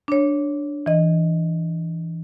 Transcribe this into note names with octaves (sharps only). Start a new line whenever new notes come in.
D4 C#5
E3 D#5